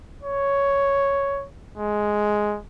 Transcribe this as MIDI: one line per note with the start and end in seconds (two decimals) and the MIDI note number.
0.23 1.45 73
1.77 2.58 56